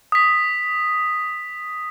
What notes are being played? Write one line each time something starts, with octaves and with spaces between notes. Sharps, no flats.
D#6 B6